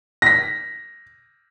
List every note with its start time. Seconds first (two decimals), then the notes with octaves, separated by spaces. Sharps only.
0.22 A#6 B6